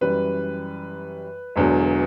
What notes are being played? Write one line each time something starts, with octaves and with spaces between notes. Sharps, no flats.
F#2 E3 G3 B4
E1 E2 D3 F#3